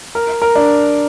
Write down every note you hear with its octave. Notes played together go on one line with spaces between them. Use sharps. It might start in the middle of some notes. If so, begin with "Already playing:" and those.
A#4
A#4
D4